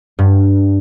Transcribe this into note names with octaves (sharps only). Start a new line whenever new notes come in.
G2